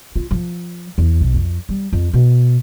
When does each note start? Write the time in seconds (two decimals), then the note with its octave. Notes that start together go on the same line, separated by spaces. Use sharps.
0.16 F4
0.31 F3
0.98 E2
1.21 B1
1.34 F2
1.69 G3
1.93 F2
2.13 B2